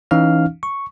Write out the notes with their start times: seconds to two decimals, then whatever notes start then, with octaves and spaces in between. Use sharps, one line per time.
0.11 E3 C#4 D#4 F5 F6
0.63 C#6